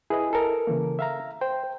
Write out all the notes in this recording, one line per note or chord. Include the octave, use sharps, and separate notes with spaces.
E4 G#4 B4 D#5
A4 A#4
C#3 E3 A#3
E5 F5 A#5
C5 G5